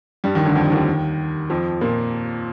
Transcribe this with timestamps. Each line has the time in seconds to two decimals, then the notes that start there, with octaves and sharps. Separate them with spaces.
0.24 G2 G3
0.35 D#2 D#3
0.45 D2 D3
0.55 F2 F3
0.71 D#2 D#3
1.50 F2 F3
1.81 A#2 A#3